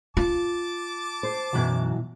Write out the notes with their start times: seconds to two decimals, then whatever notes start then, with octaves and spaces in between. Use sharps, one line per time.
0.17 F4 A5 D6
1.23 C5
1.53 B1 F#2 B2 E3 F#3